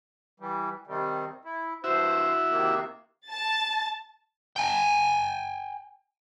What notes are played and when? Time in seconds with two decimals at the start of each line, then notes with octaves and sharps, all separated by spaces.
0.40 E3 G3
0.87 C3 D#3 G3
1.45 E4
1.84 G2 E4 F#4 C5 E5
2.50 C3 D#3 A#3
3.28 A5 A6
4.56 G5 G#5